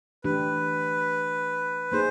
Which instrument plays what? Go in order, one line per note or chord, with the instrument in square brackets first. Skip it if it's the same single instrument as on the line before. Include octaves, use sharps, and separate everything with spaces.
[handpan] E3 A3 D4 G4 [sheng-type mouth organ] B4
[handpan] A#3 D#4 G#4 [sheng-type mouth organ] C5